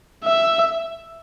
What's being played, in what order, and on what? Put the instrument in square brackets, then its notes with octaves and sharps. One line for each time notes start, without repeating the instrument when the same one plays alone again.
[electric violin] E5